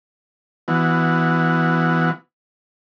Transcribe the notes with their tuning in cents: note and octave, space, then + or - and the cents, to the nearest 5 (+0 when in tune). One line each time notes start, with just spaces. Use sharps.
E3 +0 B3 +10 F#4 -15